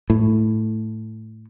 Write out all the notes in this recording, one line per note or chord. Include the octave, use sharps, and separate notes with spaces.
A2